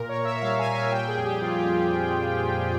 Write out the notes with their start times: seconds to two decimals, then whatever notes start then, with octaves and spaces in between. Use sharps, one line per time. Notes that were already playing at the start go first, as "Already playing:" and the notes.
Already playing: A#2 A#4
0.09 C#5
0.17 A#2
0.25 E5
0.37 E5
0.42 G3 F5
0.59 G#5
0.66 A#2
0.75 E5
0.86 G#5
0.92 G3 G5
1.08 G#4
1.17 F2
1.25 G4
1.41 F2 F4
1.58 F4
1.66 C4